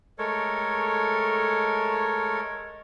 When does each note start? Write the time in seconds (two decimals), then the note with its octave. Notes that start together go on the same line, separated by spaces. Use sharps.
0.18 G#3 A3 A4 A#4 C#5